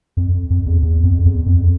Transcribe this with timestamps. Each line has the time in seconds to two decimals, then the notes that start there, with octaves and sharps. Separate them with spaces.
0.17 F2
0.50 F2
0.66 E2
0.82 E2
1.03 F2
1.25 E2
1.46 F2